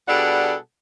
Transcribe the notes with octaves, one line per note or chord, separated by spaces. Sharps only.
B2 G3 D4 G#4 A4 F#5